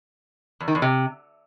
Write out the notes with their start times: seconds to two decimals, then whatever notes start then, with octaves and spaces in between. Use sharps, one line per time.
0.60 E2
0.68 D#3
0.75 E2
0.82 C3